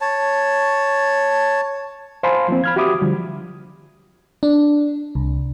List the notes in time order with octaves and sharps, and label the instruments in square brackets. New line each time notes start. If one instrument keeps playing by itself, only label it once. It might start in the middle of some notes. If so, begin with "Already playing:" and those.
[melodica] C#5 A5
[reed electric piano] C5 F5 G#5 A5 B5 C6
F3 A#3 C4
B5 F6 G#6
F#4 G4 E5 B5 D6 D#6
D3 F3 G3
[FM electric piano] D4
C2